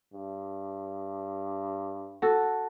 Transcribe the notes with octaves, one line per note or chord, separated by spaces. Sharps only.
G2
F#4 A4